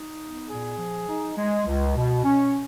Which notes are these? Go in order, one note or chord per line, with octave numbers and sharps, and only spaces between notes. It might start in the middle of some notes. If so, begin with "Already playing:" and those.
Already playing: D#4
B3
A#2 G#4
F3
D#4
G#3
C#2
B2
C#4